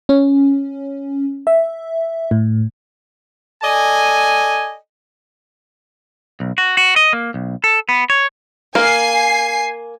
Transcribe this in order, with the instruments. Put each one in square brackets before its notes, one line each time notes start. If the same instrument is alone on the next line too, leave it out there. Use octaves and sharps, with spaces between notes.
[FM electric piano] C#4
E5
A2
[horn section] A4 D5 D#5 G#5
[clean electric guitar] B1
F#4
F#4
D#5
A#3
B1
A4
B3
C#5
[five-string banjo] A#3 A#4 F5 [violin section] G#5 C7